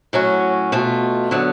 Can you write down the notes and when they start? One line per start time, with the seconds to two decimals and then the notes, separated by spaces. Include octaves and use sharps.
0.13 A2 F#3 C#4 F#4
0.72 B2 A3 F4
1.31 D3 F#3 B3